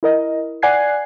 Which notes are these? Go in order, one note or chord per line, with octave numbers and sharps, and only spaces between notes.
E4 A#4 D#5
D5 F#5 G#5 F#6 G#6 C7